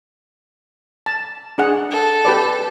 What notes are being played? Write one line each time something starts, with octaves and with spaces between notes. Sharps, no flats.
A5
D4 G#4 F#5
A4
G4 B4 D5